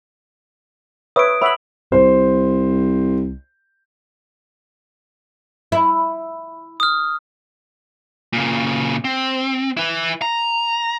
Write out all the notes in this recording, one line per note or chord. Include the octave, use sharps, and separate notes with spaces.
B4 C#5 E5 D#6 D7
C#5 E5 F#5 B5 F#7
C2 C5
E4
D#6 F6
A#2 C#3
C4
E4 B4
A#5